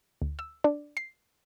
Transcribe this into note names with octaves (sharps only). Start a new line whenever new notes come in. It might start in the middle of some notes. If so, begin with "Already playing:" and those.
D2
E6
D4
C7